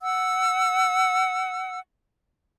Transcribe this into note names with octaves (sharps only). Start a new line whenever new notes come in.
F#5 E6